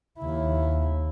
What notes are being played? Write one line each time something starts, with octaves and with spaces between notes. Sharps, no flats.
D#2 E4